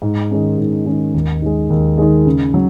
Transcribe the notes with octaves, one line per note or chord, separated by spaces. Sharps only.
G#2
D#3 G#3 C#4
G#2
D#3 G#3 C#4
D#2
D#3 G#3
D#2
D#3 G#3
C#3
F#3